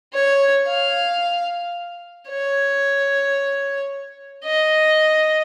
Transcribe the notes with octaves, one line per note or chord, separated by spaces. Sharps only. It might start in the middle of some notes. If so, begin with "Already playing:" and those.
C#5
F5
C#5
D#5